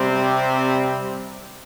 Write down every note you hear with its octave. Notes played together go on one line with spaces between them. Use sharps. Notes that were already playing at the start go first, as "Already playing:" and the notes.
Already playing: C3 G3 C4
G4